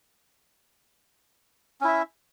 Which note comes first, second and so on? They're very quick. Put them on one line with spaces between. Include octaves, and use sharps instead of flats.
C#4 E4 E5